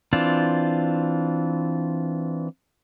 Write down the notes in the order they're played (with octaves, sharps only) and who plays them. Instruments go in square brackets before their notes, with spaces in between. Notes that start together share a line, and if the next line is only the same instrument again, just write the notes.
[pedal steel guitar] E3 C4 D4 F4